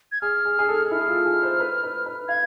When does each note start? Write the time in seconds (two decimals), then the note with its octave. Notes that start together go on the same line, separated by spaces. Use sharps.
0.12 G#6
0.21 G#4 F6
0.45 G#4
0.59 G#4
0.68 A4
0.91 E4 F6
1.00 G#4
1.08 F4
1.26 G#4
1.43 C5
1.60 B4
1.84 B4
2.06 B4
2.28 F5 G#6